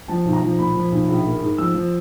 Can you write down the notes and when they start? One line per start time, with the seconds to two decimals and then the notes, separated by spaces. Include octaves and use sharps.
0.08 F3 A5
0.25 B1
0.33 A#5
0.43 F3
0.58 A#2 B5
0.75 F3
0.92 B1
1.08 A#1
1.26 A#3
1.42 G#2
1.58 F3 E6
1.74 F3